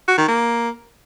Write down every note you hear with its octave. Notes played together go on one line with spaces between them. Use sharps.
F#4
D#3
A#3